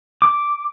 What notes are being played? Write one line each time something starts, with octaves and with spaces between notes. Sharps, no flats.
D6